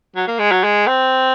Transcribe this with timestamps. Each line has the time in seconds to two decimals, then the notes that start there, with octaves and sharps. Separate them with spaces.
0.15 F#3
0.27 A#3
0.39 G#3
0.52 F#3
0.64 G#3
0.87 C4